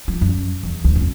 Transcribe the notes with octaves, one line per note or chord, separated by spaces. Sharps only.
F3
F#2
E2
D2
F2